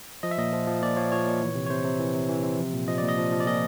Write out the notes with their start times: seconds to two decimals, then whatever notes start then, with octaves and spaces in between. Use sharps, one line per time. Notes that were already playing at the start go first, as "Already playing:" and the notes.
0.23 F3 D#5
0.31 E5
0.38 A#2 D#5
0.53 F3
0.67 F3
0.82 A#2 D5
0.97 F3 C#5
1.12 F3 C#5
1.27 A#2
1.41 E3
1.55 C3
1.67 C#5
1.70 C3 C5
1.85 C3
1.99 E3
2.14 C3
2.29 E3
2.44 C3
2.59 F3
2.73 A#2
2.88 F3 D#5
2.98 A#2 D5
3.09 D#5
3.18 F3
3.32 F3
3.40 D5
3.47 A#2 D#5